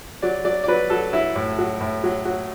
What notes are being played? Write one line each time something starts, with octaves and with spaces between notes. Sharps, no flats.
F#3 D5
F#3 D5
D5
F#3 B4
F#3 A4
F#3 E4
A2
F#3
A2
F#3
F#3